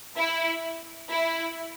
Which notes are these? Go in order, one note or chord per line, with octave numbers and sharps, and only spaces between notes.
E4
E4